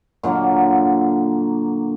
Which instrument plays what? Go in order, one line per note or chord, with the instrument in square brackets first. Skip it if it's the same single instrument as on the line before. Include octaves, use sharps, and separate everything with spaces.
[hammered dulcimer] A#2 D3 F#3 A#3